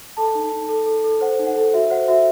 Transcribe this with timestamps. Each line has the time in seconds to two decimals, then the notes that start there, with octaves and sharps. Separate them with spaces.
0.17 A4 A5
0.35 D#4
0.52 D#4
0.69 A4
0.86 A4
1.04 A4
1.21 C5 F#5
1.39 D#4
1.47 F#5
1.56 A4
1.73 F#4 E5
1.91 C5 F#5
2.08 F#4 E5